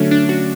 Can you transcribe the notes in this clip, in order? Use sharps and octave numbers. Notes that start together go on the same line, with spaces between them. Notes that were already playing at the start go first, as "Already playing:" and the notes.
Already playing: D3 F#3 A3 C#4 D4
D4
F#4